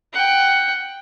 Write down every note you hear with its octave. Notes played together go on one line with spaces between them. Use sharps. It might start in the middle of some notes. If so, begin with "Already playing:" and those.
F#5 G5